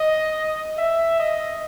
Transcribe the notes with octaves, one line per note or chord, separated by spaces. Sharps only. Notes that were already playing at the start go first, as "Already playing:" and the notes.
Already playing: D#5
E5
D#5